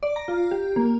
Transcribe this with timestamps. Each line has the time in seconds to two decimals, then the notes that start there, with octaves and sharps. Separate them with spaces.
0.03 D5
0.16 A#5
0.28 F4
0.51 G4
0.76 A#3